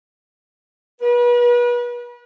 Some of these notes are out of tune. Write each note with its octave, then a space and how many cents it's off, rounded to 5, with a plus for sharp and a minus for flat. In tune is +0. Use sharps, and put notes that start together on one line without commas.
B4 -35